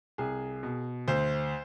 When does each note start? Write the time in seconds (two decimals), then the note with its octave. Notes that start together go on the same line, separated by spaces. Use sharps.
0.18 C2 G#4
0.63 B2
1.08 D2 C5